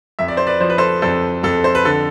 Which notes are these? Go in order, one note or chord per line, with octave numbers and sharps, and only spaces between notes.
F2 E5
D5
C5
B4 D5
F3 C5
B4
A4 C5
F2 A4 C5
F2 A4
C5
B4
D3 A4